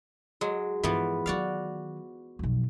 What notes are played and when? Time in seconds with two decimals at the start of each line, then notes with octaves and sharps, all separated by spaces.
0.41 F#3 G#3
0.83 G2 E3 F3 B3
1.26 D#3 F#3 F#4 D5 F5
2.39 B1 F2